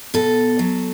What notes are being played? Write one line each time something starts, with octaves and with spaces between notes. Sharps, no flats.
B2 A4
F#3